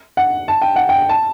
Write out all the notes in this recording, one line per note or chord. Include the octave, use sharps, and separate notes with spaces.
F#5
A5
G5
F#5
G5
A5